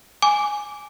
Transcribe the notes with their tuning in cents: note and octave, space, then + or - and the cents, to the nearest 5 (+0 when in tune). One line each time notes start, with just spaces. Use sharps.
G#5 +0 D6 -5